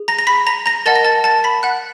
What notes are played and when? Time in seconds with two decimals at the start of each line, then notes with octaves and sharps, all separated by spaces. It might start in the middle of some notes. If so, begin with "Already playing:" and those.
Already playing: G#4
0.08 A#5 A#6
0.19 A#6
0.27 B5 B6
0.47 A#5 A#6
0.66 A#5 A#6
0.86 A#4 D#5 F#5 A5 A6
0.95 A#6
1.05 A5 A6
1.24 A5 A6
1.44 B5 B6
1.63 F#5 F#6